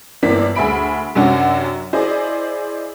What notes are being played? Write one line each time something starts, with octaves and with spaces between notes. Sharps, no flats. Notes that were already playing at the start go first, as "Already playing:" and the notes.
G1 E3 A#3 C4 D5 B6
D2 G#4 E5 G#5 B5 D7
F#2 C3 F#3 C#4 D4 F#4
E4 G#4 C5 D5 D#5